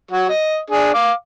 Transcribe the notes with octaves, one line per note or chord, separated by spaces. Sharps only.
F#3 F#4
D#5
D4 G#4
F5 D6